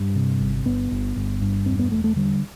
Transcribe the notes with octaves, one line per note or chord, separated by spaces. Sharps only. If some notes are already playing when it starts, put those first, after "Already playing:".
Already playing: G2
C3
G1
G1 B3
G1
G1
G2
E1 C4
B3
E1 A3
A3
D3 G3